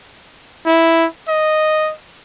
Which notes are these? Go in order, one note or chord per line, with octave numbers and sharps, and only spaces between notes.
E4
D#5